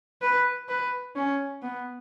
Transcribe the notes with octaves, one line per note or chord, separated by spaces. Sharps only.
B4
B4
C#4
B3